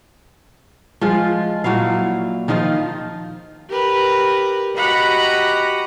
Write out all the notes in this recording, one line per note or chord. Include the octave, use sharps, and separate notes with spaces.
F3 G#3 F4
A#2 F#3 E4 F5
D#3 F3 D#4 F4
G4 A#4 B4
F#4 G4 D#5 F#5 A#5 B5